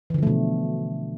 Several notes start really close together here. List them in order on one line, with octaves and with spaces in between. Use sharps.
E3 D3 F3 A3 B2